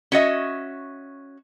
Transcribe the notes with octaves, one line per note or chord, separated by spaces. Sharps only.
C#4 F#4 D#5 E5